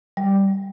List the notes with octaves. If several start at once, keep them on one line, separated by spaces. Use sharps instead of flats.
G3